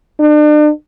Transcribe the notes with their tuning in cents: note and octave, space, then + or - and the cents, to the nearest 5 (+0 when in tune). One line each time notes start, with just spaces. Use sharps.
D4 +40